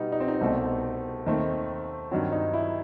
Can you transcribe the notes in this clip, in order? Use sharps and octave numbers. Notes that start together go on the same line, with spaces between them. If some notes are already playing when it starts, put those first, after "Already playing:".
Already playing: B2 G3 B3 D#4
D#4
C4
D#4
C2 B2 A3 C4
D#2 D#3 A3 C4
G2 D#3 F#3 C4
D#4
E4